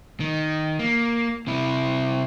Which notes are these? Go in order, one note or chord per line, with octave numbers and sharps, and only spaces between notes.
D#3
A#3
C3 E4